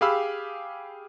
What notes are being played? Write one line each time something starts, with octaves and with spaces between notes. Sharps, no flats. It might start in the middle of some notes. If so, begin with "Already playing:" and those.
G4 G#4 F5 B5 E6